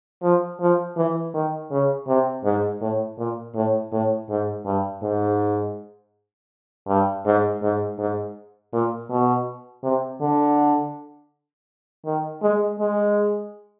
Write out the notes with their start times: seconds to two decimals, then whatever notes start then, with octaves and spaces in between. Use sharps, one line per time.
0.23 F3
0.60 F3
0.97 E3
1.34 D#3
1.71 C#3
2.08 C3
2.44 G#2
2.81 A2
3.18 A#2
3.55 A2
3.92 A2
4.30 G#2
4.66 G2
5.02 G#2
6.88 G2
7.25 G#2
7.62 G#2
7.99 G#2
8.73 A#2
9.10 B2
9.83 C3
10.21 D3
12.05 D#3
12.42 G#3
12.80 G#3